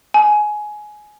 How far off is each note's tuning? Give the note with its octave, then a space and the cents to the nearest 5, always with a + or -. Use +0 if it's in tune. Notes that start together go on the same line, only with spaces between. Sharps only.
G#5 +15